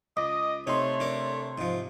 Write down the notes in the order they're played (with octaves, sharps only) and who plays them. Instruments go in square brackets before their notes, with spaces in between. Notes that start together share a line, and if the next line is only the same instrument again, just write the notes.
[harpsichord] C#2 [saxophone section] D#5 [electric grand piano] D6
[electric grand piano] C3 C6 [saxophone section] A3 C#5 [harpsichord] D#4
[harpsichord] D4 A#4
G#2 F3